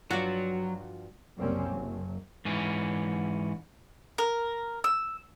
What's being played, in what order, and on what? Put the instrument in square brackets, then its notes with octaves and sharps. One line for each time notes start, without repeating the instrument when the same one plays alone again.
[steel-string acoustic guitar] G2 F3 [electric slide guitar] F#3 [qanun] F4 D5 [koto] F#4
[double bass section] F#1 C2 G3 A#3 C4 C#4
F#1 F#3
[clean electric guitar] G#2 E3 C#4
[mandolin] A#4
E6